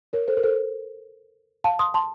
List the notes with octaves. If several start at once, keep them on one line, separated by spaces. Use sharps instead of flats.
A#4 C#5
A4 C5
A#4
A4 C5
F5 A5
C6 D#6
A5 C6